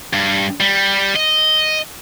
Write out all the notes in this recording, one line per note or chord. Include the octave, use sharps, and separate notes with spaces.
G2
G3
D#5